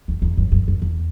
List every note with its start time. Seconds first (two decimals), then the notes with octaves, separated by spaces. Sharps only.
0.08 E2
0.22 E2
0.37 F#2
0.52 F#2
0.68 F#2
0.82 E2